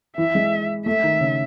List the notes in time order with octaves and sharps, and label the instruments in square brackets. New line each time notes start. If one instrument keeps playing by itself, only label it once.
[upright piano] E3 [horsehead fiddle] E5
[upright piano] G#3
[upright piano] A3 [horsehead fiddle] E5
[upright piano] D#3
C#3